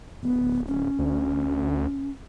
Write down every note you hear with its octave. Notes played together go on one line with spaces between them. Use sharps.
D1 B3
C#4
D2